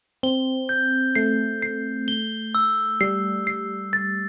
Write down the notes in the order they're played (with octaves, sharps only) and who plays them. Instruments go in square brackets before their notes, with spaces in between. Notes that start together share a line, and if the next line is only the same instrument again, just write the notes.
[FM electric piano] C4 [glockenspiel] G7
[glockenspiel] G6
[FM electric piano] A3 [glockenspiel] C7
[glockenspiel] C7
G7
E6
[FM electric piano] G3 [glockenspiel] C7
[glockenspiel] C7
A6